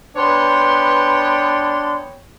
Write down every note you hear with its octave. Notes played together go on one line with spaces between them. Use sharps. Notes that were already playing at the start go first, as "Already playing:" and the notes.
B3 D4 B4 C#5 G5 C6